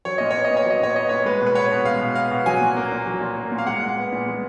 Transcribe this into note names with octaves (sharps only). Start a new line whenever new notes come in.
F#3 C#5
A#2 D#5
C#5
B3
D#5
A#2
C#5
F#3 D#5
A#2 C#5
B3 D#5
A#2 C#5
G#3 B4
B2
B4
B3 C#5
B2
G#3 F5
B2
B3 F5
B2
F#3 G#5
A#2
A#3
A#2
F#3
A#2
A#3
A#2
F5
G#3 F#5
A#2
B3
A#2
G#3